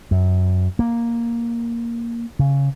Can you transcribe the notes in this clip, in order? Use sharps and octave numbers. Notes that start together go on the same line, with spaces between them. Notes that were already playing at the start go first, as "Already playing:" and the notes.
F#2
A#3
C#3